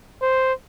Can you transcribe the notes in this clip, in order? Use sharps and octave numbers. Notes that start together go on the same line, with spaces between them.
C5